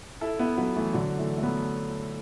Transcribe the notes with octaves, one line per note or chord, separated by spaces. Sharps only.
E4 A4
B3 E4
F#3 B3
E3 A3
D3 F#3
E3 A3
A3
F#3 B3